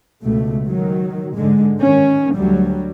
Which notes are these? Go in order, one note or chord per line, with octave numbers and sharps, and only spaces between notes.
C#2 B2 A3
D#3 F#3
G#2 D3 G#3
D#3 C#4
D2 F#3 G3